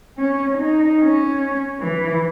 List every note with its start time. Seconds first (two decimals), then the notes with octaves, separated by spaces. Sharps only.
0.18 C#4
0.58 D#4
0.99 C#4
1.80 E3